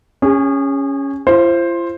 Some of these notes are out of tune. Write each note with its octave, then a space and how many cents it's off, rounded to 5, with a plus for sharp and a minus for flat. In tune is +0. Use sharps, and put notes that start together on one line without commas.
C#4 +0 G#4 -35
F4 -45 C5 +10